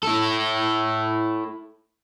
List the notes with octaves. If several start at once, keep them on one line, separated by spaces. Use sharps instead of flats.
E4 A4